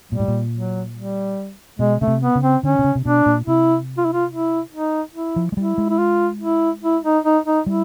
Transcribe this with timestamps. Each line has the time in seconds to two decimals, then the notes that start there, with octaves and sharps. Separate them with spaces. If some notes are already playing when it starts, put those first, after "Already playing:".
0.12 A#2 G3
0.20 A2
0.28 A#2
0.54 F#3
0.95 G3
1.79 B2 G#3
2.00 C#3 A3
2.07 C3
2.22 B3
2.35 C#3
2.42 C4
2.63 D3 C#4
2.79 C3
2.84 C#3
2.95 C3
3.05 B2 D4
3.26 A#2
3.47 C3 E4
3.98 F4
4.05 E4
4.13 F4
4.31 E4
4.72 D#4
5.14 E4
5.36 F3
5.52 G#3
5.57 G3 E4
5.78 G#3
5.89 E4
5.99 F4
6.41 E4
6.83 E4
7.04 D#4
7.24 D#4
7.46 D#4
7.66 G3 E4